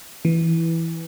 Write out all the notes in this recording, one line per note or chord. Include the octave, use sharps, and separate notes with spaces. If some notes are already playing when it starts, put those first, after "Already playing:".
E3